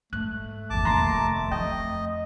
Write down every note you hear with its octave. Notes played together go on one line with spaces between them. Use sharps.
G#2 A3 F#6
G#1 E2 A5 D6
F1 D#2 A#5 C6 A#6
F2 D#5 G5